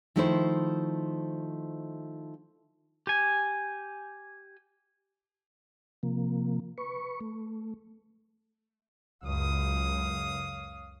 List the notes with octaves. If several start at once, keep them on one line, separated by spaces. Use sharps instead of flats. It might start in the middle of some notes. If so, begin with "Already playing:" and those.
D#3 F3 A3 D#4 E4 C5
G4 G#5
C3 F3 A#3
B4 C#6
A3
C#2 F#2 C#5 F5 D#6